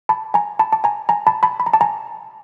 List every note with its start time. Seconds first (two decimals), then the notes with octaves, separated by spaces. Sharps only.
0.09 A5 B5
0.34 G#5 A#5
0.59 A5 B5
0.73 A5
0.84 G#5 A#5
1.09 G#5 A#5
1.27 A5 B5
1.43 A5 B5
1.60 B5
1.66 A#5
1.73 A5
1.81 G#5 A#5